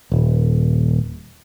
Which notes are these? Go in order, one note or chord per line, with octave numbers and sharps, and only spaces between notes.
D#1